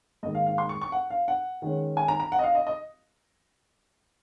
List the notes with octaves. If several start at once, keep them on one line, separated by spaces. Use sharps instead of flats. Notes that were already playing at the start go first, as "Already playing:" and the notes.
G#2 D#3 A#3 D#5
F5
F5
C6
C#6
C#6
F#5
F5
F#5
D#3 G#3 C#4
G#5
A#5
A#5
F#5
D#5
F5
D#5
D#5